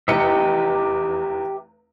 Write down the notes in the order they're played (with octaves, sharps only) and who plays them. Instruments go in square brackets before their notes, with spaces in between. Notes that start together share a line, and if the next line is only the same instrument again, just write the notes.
[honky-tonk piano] F1 E2 C#7 [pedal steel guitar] G4 D#5 E5